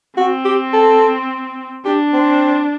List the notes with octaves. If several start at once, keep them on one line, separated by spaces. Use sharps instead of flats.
C4 F#4
G4
A4
D4 G4
C4